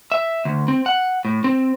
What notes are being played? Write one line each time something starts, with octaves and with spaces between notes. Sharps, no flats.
E5
D2
C4
F#5
A2
C4